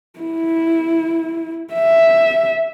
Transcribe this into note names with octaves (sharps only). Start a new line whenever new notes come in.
E4
E5